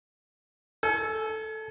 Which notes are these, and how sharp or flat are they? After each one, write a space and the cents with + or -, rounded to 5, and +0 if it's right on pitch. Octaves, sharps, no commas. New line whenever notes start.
A4 +0 G#5 +35